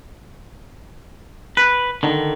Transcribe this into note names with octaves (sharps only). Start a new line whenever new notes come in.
B4
D3 D#3